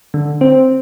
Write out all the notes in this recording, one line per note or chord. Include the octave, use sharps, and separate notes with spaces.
D3
C4